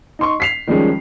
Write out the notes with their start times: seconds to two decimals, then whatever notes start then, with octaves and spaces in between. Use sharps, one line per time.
0.19 D#4 C6 C#6
0.40 B6 C7 F7
0.67 D#3 F3 G3 G#3 C#4